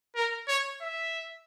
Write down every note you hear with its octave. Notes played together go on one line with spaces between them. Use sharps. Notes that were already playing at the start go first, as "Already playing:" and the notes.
A#4
C#5
E5